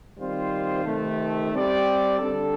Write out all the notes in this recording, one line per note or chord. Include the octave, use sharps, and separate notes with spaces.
D#3 G3 C4 F4 C5
C3 D#3 A3
G3 C4 G4 D5
D3 G3 D4 A4